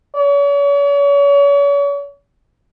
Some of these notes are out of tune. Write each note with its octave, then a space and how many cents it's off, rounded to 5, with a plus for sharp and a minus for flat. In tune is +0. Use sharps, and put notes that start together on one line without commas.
C#5 +40